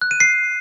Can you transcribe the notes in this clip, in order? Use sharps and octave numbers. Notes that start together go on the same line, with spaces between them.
F#6
D#7
C7